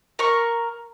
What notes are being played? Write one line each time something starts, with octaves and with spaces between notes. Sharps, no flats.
A#4 C#6